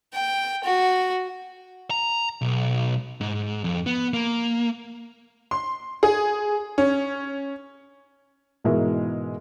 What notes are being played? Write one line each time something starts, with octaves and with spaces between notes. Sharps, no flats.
G5
F#4
A#5
B1
G#2
F2
B3
A#3
C6
G#4
C#4
G#2 B2 E3 G#3 A#4 E5